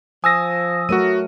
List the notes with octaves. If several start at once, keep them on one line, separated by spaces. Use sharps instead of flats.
F3 G#5 D#6 E6 A#6
F#3 A3 F#4 A#4 D#7